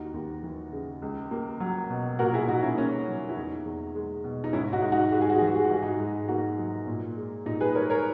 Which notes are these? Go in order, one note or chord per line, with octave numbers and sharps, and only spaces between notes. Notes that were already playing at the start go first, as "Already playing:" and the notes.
Already playing: D#2 D#4 F#4
D#2
E3
C#3
C#2
A#3
F#3
B2
A#2 F#4 A#4
E4 G#4
A#2 D#4 F#4
C#4 E4
A#3 C#4
F#3
E4
E2 D#4
E2
G#3
B2
D#4
G#2 C#4 E4
D#4 F#4
G#2
D#4 F#4
G#3 F#4
G#4
F#4
E3 G#4
F#4
G#4
F#4
G#2 G#4
D#4 F#4
G#2
A#3 D#4 F#4
F#3
A#2
G#3
A#2 D#4
G#4 B4
G#3 A#4 C#5
A#4 C#5